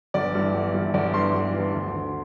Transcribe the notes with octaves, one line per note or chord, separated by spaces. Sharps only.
G1 D5
G2 E3
G1
G2 E3
G1 D5
G2 E3 C6
G1
G2 E3
D2
D3